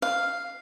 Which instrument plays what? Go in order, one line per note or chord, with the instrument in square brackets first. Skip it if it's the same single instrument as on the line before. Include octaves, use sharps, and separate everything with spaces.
[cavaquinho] F5